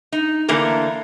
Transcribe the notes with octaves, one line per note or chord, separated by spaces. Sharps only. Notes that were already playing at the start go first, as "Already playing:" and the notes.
D#4
D3 E3 A3 A#3 A#4